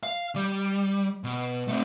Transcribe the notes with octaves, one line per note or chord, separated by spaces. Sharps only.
F5
G3
B2
A3 C4